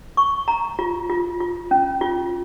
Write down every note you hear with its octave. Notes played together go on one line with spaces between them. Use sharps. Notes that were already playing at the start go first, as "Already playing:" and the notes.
C#6
A#5
F4
F4
F4
C#4
F4